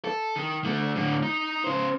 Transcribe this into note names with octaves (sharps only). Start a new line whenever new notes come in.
A4
D#3
D3 A3
A2 D3
D#4
C#3 C5